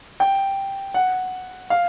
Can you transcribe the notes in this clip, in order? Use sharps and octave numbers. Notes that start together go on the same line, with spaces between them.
G5
F#5
F5